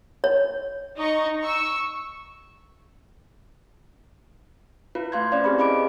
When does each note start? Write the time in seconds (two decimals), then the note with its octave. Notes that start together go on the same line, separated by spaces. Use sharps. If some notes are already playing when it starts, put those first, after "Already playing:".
0.24 C#5
0.96 D#4 D#5 C#6
1.42 C#6 E6
4.95 E4 F4 B4
5.12 A3 E4 F5 C6 G6 G#6
5.32 C#4 E4 B4 C5 D5 F5
5.44 C4 G4 G#4 C5 B5
5.58 E4 G#4 D#5 B5 D6 D7